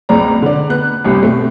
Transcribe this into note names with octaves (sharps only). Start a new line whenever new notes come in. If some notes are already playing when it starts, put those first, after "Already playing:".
F#1 C#2 C4 D5 A#5
D3 D5
B3 F#6
G1 C2 C3
B2 A3 C4